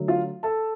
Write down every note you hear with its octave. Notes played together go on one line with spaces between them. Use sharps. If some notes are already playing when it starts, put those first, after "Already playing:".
Already playing: D3 F#3 A3
F4 F5
A4 A5